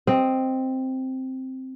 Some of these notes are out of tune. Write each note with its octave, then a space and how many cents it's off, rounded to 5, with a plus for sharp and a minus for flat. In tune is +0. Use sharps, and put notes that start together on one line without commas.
C4 +0 D#5 +0